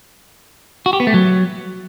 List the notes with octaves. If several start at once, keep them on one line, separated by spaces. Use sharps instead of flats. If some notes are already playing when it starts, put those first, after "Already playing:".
F#4
G4
B3
A3
F#3